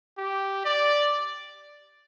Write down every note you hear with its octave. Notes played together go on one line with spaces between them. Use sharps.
G4
D5